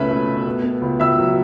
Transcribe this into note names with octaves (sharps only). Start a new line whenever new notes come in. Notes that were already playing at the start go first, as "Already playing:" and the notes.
Already playing: C#2 B2 A3 C#4 B4 E5 B5
A3
B2
B3
B3
C#2
C#2 E5 E6
F#3